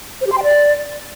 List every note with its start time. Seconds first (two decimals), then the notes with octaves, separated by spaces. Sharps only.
0.21 C5
0.27 G4
0.32 C6
0.38 G5
0.43 D5